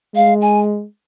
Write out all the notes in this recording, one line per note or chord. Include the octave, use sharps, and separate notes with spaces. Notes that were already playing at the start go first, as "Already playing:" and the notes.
G#3 F5
G#5